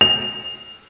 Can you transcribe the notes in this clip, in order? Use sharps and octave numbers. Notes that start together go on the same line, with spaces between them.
F7